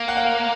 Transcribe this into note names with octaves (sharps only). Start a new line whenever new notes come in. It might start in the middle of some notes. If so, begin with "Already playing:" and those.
Already playing: A#3 F5
F#5
F5